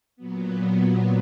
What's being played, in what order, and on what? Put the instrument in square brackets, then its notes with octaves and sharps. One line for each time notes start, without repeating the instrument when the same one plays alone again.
[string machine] A#2 F#3 B3